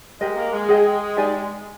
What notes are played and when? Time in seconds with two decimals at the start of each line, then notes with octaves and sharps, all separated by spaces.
0.21 G#3 G4 A#4 D#5
0.37 A#3
0.53 G#3
0.69 G#4 D#5 G5
1.17 D#4 G4 D5 G#5